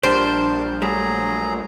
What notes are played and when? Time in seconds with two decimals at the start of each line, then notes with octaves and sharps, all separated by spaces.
0.03 A#1 G3 D4 G4 A#4 C5 A5
0.82 F#3 G3 A3 G#4 A#5